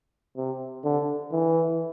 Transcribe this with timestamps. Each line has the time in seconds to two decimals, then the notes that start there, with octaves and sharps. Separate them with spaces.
0.37 C3
0.84 D3
1.32 E3